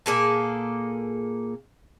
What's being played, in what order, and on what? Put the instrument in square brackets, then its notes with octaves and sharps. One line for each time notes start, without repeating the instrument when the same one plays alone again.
[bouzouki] A#2 A#3 G#4 A4